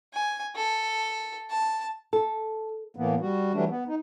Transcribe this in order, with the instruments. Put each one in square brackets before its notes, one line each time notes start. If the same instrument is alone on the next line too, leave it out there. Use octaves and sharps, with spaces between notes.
[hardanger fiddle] G#5
A4
A5
[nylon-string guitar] A4
[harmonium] A2 E3 A#3 B3
G3 F#4
E3 F#3 G3 A3 D4
B3
D#4